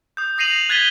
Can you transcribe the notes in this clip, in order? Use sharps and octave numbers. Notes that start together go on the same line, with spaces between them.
D#6 G6
D#6 A#6 C7 D#7 F7 F#7
F#6 G#6 A6 B6 D#7 G7